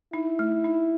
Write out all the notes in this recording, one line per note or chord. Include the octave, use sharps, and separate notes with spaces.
D#4 E4
A3
D#4